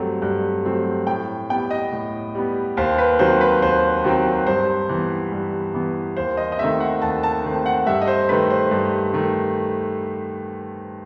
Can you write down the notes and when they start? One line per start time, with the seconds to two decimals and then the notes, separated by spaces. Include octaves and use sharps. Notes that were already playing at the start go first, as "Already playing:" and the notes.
Already playing: G2 F#3 A3 C4
0.22 G2
0.65 F#3 A3 C4
1.07 A2 G5
1.50 G3 B3 G5
1.71 D#5
1.92 A2
2.35 G3 B3
2.77 D#2 C5
2.98 B4
3.19 D#3 F#3 C4 C5
3.41 B4
3.62 D#2 C5
4.04 D#3 F#3 C4
4.47 G2 C5
4.89 E3 B3
5.32 G2
5.74 E3 B3
6.17 D#2 C5
6.37 D#5
6.52 D#5
6.59 D#3 A3 C4 E5
6.80 F#5
7.02 D#2 A5
7.23 A5
7.44 D#3 A3 C4
7.66 F#5
7.87 G2 E5
8.02 D#5
8.08 C5
8.29 D#3 A3 B4
8.50 C5
8.71 G2
9.13 D#3 A3